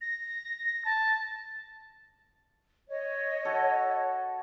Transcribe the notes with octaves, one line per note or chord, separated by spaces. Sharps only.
A#6
A5
C#5 D#5
F#4 A4